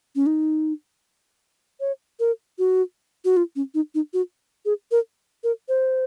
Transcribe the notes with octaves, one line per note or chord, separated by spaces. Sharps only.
C#4
D#4
C#5
A#4
F#4
F#4
F4
C#4
D#4
D#4
F#4
G#4
A#4
A#4
C5